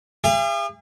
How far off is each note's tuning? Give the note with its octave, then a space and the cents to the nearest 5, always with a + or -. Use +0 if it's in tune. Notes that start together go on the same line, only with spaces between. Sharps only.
G#4 -45 F5 -45